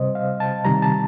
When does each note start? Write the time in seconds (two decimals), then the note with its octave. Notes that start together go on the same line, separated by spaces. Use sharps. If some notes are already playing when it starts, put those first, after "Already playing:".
Already playing: C3 G3 C5 D#5
0.15 F5
0.40 A5
0.65 C3 D#3 G3 A#5
0.82 A5